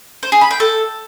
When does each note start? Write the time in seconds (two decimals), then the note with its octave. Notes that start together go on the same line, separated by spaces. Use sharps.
0.23 C5
0.32 G#4
0.41 B5
0.51 G5
0.60 A4